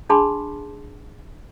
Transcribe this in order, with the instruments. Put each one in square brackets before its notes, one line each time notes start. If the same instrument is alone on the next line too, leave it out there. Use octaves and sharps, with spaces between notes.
[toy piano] D4 G#4 A5 B5 C6 D6